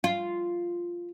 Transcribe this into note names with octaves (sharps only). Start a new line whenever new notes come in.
F4